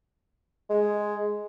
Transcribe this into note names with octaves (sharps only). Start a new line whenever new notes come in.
G#3